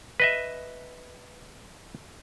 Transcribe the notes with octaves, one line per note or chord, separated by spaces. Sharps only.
B4 D#5 E5